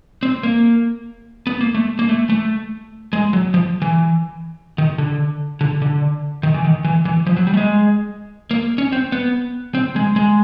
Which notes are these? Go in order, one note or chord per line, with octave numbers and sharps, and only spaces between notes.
C4
A#3
B3
A#3
A3
A#3
A3
A3
G#3
F#3
F3
E3
D#3
D3
D3
D3
D#3
E3
D#3
E3
E3
F3
F#3
G3
A3
G#3
A#3
C#4
C4
B3
C4
G#3
G#3